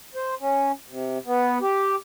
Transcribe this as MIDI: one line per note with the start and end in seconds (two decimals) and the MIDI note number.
0.15 0.35 72
0.40 0.72 61
0.88 1.18 48
1.26 1.58 59
1.62 1.95 67